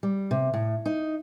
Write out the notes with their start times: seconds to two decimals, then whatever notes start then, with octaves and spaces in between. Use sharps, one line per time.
0.03 G3
0.31 C3
0.54 A2
0.86 D#4